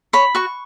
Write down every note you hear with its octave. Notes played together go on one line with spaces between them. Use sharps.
C#5 B5
F#4 C#6